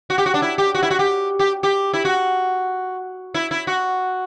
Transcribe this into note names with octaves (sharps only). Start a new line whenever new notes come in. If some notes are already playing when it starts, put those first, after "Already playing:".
F#4
G4
F#4
D4
E4
G4
F#4
E4
F#4
G4
G4
G4
E4
F#4
E4
E4
F#4